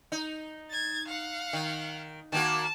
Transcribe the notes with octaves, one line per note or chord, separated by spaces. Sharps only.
D#4
G#6 A6
F5 F#5
D#3
D#3 A#3 F#4 A5